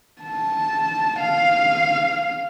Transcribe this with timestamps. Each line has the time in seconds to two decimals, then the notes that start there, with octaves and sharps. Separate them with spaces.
0.22 A5
1.20 F5